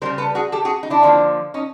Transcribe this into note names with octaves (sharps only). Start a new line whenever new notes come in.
C#3 E3 G3 A#4 C5
A4 B4
F#4 G#4
G4 A4
F#4 G#4
D#4
D4 E4
D3 F3 A#3
C#4 D#4